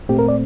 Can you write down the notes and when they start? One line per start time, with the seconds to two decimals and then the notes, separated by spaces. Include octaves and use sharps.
0.09 A#2 A3 C4 G4
0.19 A#4
0.28 D5